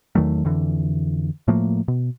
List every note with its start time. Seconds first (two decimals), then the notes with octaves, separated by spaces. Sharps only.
0.15 E2 D#3 F#3 A3
0.45 F2 D3 E3
1.48 A2 F3 A3 A#3
1.88 B2